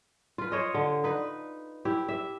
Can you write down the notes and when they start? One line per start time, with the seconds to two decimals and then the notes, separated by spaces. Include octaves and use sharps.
0.38 F4 B4
0.52 C5 C#5 D#5
0.74 D3
1.04 D#4 B4
1.85 E4 G4
2.08 E5